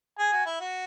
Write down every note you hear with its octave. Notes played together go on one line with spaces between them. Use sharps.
G#4 G#5
F#4
E4
F#4